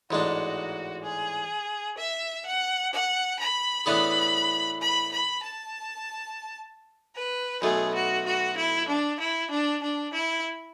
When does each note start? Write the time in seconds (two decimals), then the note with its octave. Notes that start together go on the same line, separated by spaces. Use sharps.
0.11 A1 G#2 G#3 D4 F#4
1.04 G#4
1.98 E5
2.45 F#5
2.93 F#5
3.39 B5
3.86 A2 E3 B3 D4 G#4 B5
4.81 B5
5.12 B5
5.43 A5
7.15 B4
7.62 B1 B2 A3 G#4
7.94 F#4
8.25 F#4
8.57 E4
8.88 D4
9.19 E4
9.50 D4
9.82 D4
10.13 E4